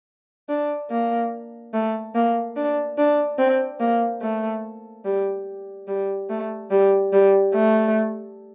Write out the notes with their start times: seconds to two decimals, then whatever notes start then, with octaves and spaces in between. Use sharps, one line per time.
0.49 D4
0.90 A#3
1.73 A3
2.15 A#3
2.56 D4
2.98 D4
3.38 C4
3.80 A#3
4.22 A3
5.05 G3
5.88 G3
6.29 A3
6.70 G3
7.12 G3
7.54 A3